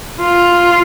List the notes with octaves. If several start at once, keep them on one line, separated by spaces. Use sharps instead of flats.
F4